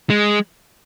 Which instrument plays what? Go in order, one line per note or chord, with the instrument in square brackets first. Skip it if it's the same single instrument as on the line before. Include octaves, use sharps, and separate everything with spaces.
[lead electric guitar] G#3